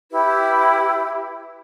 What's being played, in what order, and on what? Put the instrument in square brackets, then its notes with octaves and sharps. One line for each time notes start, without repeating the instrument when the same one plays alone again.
[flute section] E4 G4 B4